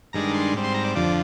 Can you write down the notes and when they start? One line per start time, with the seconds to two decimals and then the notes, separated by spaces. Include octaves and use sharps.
0.13 G2 D#3 G#3 D4 A#5
0.34 C6
0.54 G#2 G3 C4
0.64 C6
0.74 A#5
0.84 D5
0.95 F2 D3 F3 D5